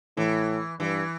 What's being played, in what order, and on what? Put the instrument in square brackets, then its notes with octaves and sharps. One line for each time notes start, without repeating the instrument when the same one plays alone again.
[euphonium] A2 [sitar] E3
[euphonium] G2 [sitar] E3